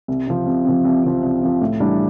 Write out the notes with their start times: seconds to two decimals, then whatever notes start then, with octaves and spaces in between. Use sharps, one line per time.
0.08 C2
0.27 C3 F3
0.46 C2
0.65 C3 F3
0.85 C2
1.04 C3 F3
1.23 C2
1.42 C3 F3
1.62 A2
1.80 E3 G3 D4